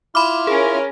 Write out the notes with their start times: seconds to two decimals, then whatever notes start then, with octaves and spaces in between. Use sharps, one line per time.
0.15 E4 F4 B5 D6 F6
0.47 C#4 G#4 A#4